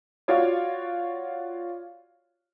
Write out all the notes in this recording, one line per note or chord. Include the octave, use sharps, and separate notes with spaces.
F4 F#4 C#5 D5